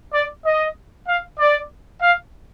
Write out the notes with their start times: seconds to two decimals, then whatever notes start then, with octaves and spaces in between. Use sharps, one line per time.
0.14 D5
0.45 D#5
1.08 F5
1.40 D5
2.02 F5